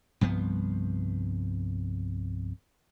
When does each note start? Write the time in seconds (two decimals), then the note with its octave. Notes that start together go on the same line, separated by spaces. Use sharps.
0.21 C2 G2 F3 B3